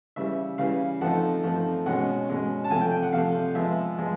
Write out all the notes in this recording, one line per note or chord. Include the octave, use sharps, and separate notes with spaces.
C#3 E3 G3 E5
C#3 E3 G3 F5
F3 A3 C4 D#4 F#5
F3 A3 C4 D#4
B2 G#3 C#4 F#5
B2 G#3 C#4
A5
C3 F3 A3 G#5
G5
G5
F#5
C3 F3 A3 F5
F3 G#3 B3 E5
F3 G#3 B3